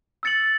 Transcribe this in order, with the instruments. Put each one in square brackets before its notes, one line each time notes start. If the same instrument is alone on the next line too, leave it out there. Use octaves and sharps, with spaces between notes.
[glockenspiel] E6 A6 C#7 F#7